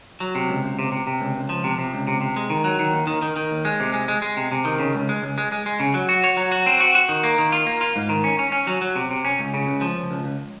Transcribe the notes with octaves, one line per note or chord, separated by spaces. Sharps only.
F#3
C3
C#2
C#2
C3
C3
C3
C#2
C#2
F3
C3
C3
C#2
C3
C3
G#3
D#3
F#3
D#3
D#2
D#3
D#3
D#3
D#2
G#3
C3
G#3
G#3
G#3
C3
C3
D#3
C#3
C#2
G#3
C#2
G#3
G#3
G#3
C#3
F#3
F#4
C#5
F#3
F#4
C4
F#4
F#4
D#3
A#3
D#3
F4
A#3
F4
G#2
D#3
C#4
C#4
C#4
F#3
F#3
C3
C3
C#4
C#2
C#3
C#2
F3
C#2
C#2
C#2